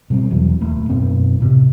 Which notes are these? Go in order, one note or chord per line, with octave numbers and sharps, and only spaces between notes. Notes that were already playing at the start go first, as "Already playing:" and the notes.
B2 G3 C4
E1 E2 E3 F#3
D#1 A3
F#2 B2 C4
A2 C3